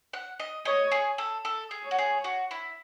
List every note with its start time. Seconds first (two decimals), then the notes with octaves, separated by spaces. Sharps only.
0.13 F#5
0.40 D#5
0.65 C#5 D#5
0.92 G#4
1.18 A4
1.45 A4
1.71 G#4
1.84 C#5
1.91 F#4
1.98 G#4
2.24 F#4
2.51 E4